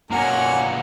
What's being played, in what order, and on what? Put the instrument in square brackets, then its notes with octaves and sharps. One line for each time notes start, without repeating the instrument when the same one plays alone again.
[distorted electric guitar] B2 A#3 [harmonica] C#4 A#4 G#5 [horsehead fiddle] F#5